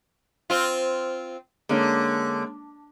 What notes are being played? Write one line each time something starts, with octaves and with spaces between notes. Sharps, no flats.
C4 F4
D3 G#3 A#3 C#4